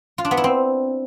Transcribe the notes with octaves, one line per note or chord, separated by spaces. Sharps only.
F4
D4
B3
E4
C4